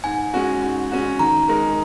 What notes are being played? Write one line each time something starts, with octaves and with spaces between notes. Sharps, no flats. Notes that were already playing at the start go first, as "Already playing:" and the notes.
G#2 G#5
G#3 C#4 F#4
G#2
G#3 C#4 F#4
D#3 A#5
G#3 D#4 A#4